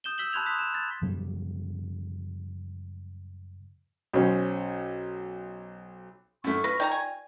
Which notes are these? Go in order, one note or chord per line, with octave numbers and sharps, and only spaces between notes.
D#6 G6 E7 G7
E6 B6 F#7 G7
A5 B5 C6 F#6 G#6 F7
D#6 B6
A5 E7
G#6 A6
F#2 C#3 F3 G3
B1 C#4 C5
F#2 A3 C#6
F4 B4 A#6
D#4 D5 G5 A5 A#5
G#5